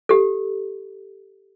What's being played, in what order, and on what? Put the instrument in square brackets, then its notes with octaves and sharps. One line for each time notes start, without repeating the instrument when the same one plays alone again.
[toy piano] G4 A4